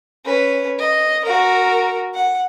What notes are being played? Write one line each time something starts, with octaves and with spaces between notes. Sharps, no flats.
C#4 B4
D#5
F#4 A#4
F#5